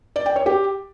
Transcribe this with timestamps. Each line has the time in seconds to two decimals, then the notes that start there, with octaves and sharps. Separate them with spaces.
0.16 D5
0.26 G5
0.36 C#5
0.46 G4